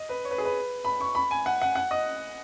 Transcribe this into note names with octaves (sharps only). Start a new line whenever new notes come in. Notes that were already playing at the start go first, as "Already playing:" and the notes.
Already playing: D#5
B4
C#5
B4
G#4
B4
B5
C#6
B5
G#5
F#5
F#5
F#5
D#5